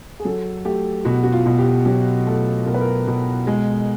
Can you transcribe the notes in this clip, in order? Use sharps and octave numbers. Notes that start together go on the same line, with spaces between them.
G#4
F#3 A4
A3 G4
B2 F#4
F#4
F4
B2
G4
F#3 G4
A3 A4
B2 A#4
B4
A#4
B2
G#3